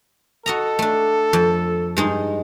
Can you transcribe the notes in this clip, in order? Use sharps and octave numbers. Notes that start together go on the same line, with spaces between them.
F#4 A4 D#5 A#5
A3 D4
F2
G2 G#3 D#4